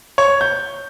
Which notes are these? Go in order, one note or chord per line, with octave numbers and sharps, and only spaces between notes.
C#5
G6